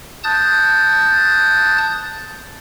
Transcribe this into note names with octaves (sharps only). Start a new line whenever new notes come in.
A5 D#6 F#6 G6 A6